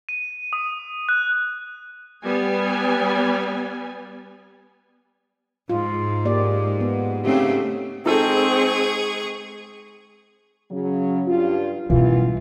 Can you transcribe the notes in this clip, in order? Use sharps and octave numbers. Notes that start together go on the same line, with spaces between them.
D#7
D#6
F#6
G3 B3 G#5
G#2 F4
A#3 G4 D5
B3
C#3 A3 C4 D#4 G4
G#3 C4 D#4 G#4 A4 C#6
C#3 F#3 C#4
G2 F4
F#2 B2 E3 G3 F4